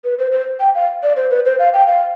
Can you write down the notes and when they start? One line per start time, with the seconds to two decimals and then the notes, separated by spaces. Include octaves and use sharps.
0.04 B4
0.19 C5
0.32 C5
0.60 G5
0.75 F5
1.03 D5
1.16 C5
1.31 B4
1.45 C5
1.59 F5
1.74 G5
1.87 F5